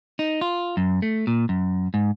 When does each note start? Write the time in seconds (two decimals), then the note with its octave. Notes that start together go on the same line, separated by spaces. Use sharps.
0.19 D#4
0.41 F4
0.77 F#2
1.02 A3
1.27 A#2
1.49 F#2
1.94 G#2